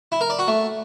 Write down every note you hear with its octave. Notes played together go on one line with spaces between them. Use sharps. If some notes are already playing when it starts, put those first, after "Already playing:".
E4
A#4
D5
F#4
A3